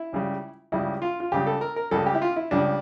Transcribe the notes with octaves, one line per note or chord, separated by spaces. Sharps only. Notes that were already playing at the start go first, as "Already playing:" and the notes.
Already playing: E4
C#2 C#3 G3
C#2 C#3 G3 E4
F4
F4
C#2 C#3 G3 G4
A4
A#4
A#4
C#2 C#3 G3 A4
G4
E4
F4
E4
C#2 C#3 G3 D4